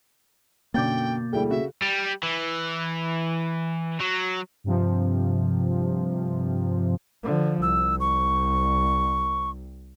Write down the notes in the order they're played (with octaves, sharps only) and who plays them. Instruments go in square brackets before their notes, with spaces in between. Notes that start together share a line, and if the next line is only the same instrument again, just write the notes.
[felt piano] F#2 D3 [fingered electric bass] B2 A#3 [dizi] G5 [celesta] D6 G6 A6
[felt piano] D2 G3 E4 [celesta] G#4 A4 [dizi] G5
[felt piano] C#3 F#4 [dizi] E5
[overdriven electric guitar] G3
E3
F#3
[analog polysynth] G2 C3 F3
[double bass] D3 F3
[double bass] C2 [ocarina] E6
[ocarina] C#6